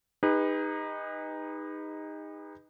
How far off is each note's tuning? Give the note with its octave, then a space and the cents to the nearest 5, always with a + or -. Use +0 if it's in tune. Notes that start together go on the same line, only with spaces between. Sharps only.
D#4 +0 G#4 -45 B4 +0